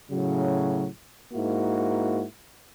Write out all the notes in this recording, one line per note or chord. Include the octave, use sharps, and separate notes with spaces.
A2 C#3 F#3
G#2 A#3 E4 F#4